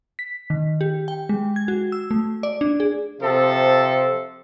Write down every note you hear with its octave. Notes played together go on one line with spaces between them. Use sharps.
B6
D#3
G4
G5
G#3
G#6
F#4
E6
A3
D5
D4
G#4
C3 F3 A4